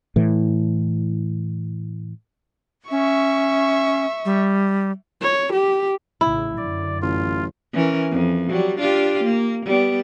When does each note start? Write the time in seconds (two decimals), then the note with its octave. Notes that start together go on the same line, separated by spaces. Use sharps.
0.16 A2 E3
2.91 C#4 E5 C#6
4.25 G3
5.21 C#5
5.52 G4
6.21 A1 A2 C#3 E4
6.57 F#2 D3 F#3 D5
7.02 A1 F4
7.73 E3 C#4 A#4
8.12 F2
8.49 F#3 G3
8.78 D4 F4 G4
9.24 A#3
9.66 G3 B3